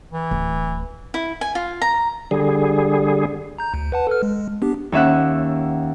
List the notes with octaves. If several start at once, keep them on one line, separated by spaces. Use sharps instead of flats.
E3
D1
E4
G#5
F4
A#5
D3 G3 G#4
A#5 G6
D2
B4 F#5 A5
A4 B4 F6
G#3
B3 D4 G4
D#2 C#4 E5 F#5